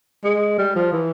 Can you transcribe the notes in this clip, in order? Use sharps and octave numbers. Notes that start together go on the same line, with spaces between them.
G#3
G3
F3
E3